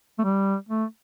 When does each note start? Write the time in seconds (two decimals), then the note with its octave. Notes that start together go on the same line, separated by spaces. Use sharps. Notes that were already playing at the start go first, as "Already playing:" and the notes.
0.19 A3
0.24 G3
0.69 A3